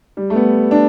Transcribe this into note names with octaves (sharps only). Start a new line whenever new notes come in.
G3
A3
B3
D4